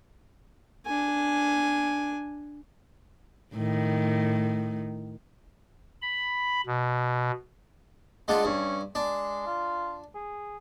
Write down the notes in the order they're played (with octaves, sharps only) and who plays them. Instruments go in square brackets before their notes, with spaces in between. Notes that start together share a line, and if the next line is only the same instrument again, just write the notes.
[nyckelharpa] D4 G#5
[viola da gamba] A2 D#3
[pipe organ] B5
B2
[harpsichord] G#3 D4 F4 [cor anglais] F#5
[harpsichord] G2 [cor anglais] C#4
[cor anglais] G#3 [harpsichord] D4
[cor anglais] F4
G#4